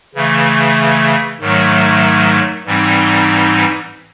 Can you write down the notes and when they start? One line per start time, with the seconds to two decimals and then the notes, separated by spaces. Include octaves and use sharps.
0.15 C#3 E3 A3
1.40 G#2 D#3 F#3 A3
2.65 G#2 E3 G3 C4 D#4